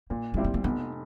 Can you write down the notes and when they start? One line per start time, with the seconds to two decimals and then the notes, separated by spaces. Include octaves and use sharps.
0.10 A#2 A#3
0.34 G3 G#3 C4 E4
0.44 A3
0.54 A#3
0.64 F1 B3